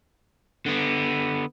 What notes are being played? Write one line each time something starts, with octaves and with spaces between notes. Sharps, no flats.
D3 B3